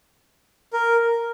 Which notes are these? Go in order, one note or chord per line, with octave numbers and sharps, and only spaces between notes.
A#4